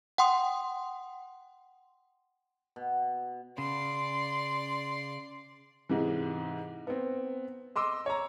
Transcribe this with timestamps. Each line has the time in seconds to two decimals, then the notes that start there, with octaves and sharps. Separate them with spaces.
0.18 F#5 G5 C6 D#6
2.76 B2
3.58 C#3 D5 C6
5.89 G#2 C3 E3
6.87 B3 C4
7.76 D#5 C6 D6 E6
8.06 C#5 A#5